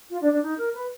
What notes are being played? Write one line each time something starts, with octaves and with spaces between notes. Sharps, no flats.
F4
D4
D4
D#4
A#4
B4